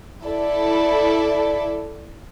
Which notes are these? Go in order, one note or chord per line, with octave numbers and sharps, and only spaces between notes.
E4 A4 D5